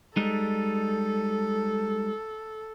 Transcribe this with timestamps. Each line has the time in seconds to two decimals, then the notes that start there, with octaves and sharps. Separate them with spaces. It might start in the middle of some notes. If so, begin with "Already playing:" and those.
0.17 G3 G#3 D#4 A4